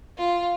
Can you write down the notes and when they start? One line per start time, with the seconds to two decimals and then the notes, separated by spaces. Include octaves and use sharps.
0.18 F4